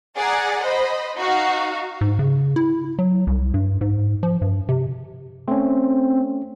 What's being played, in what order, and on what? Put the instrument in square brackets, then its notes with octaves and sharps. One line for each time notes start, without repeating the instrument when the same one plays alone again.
[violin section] G#4 D5 F#5 A#5
C5 D#5 B5
D#4 F#4 F5
[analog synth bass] G#2
C#3
E4
F#3
C2
G2
G#2
F3
G2
C3
[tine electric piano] A3 C#4 [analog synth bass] C4